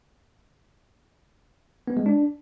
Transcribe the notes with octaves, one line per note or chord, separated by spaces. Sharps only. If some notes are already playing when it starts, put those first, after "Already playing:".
B3
G#3
D4